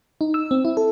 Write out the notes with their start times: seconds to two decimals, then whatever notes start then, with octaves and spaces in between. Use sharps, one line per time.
0.21 D#4
0.34 E6
0.51 C4
0.65 E4
0.77 A4